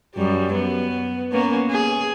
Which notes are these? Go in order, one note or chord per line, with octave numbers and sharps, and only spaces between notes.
F#2 G3
B3
A#3 B3 C#4
G#4